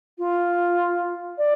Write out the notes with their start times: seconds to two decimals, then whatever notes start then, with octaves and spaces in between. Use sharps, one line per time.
0.18 F4
1.38 D5